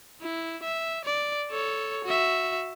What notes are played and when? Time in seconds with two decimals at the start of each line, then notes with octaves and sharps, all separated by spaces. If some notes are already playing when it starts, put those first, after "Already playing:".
0.22 E4
0.63 E5
1.05 D5
1.51 A4 C#5
2.05 F#4 E5